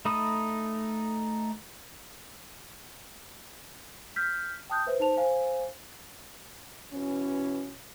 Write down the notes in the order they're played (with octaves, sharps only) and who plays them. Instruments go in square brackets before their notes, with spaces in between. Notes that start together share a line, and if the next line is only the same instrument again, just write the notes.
[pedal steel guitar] A3 D#4 B5 D#6
[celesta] F6 G6 B6
G5 A5 D#6 F#6 G6
B4 C5 E5
D#4 C5 A5 F7
C5 F5 G#5
[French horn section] B2 E3 C#4